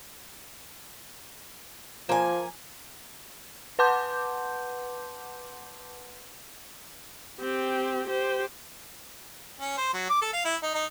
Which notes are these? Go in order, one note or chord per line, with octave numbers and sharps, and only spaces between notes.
F3 A#3 G#5
B4 F#5 A5 C6 D6 G6
C4 G4
G4 C5
C#4
C5
F#3
D6
A4
F5
E4
D#4
D#4